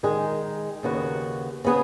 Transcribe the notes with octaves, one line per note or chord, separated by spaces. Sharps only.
D#3 G#3 D#4 G#4
D#2 C#3 B3 F#4
C#3 B3 G#4